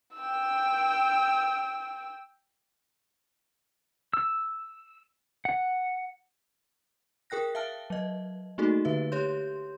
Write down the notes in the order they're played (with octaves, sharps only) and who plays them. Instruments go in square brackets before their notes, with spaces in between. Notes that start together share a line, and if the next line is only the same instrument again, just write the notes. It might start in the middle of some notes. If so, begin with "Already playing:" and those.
[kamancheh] G5 E6
[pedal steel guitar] E6
F#5
[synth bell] G#4 A#4 G5 F#6 A#6
E5 F5 A5 F6
F#3 D#5
A3 A#3 D#4 F#4 G#4 A4
D3 B4 E5
G4 C#5 C6 G6